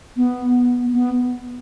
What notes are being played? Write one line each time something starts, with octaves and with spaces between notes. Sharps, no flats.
B3
B3